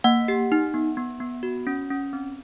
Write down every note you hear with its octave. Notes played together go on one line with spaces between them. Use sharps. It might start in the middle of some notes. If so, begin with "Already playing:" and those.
A#3 F#5
G4
D#4
B3
B3
B3
F#4
C#4
C#4
C4